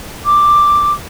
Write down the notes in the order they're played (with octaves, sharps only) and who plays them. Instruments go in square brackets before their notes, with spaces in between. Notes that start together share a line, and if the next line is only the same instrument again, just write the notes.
[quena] D6